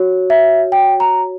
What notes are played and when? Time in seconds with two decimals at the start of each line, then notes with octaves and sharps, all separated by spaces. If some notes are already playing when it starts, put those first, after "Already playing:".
Already playing: F#4 C#5
0.30 E5
0.72 G5
1.00 A#5